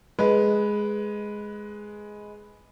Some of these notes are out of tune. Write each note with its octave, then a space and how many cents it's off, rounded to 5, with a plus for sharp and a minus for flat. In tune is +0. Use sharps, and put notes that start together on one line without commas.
G#3 +5 B4 +0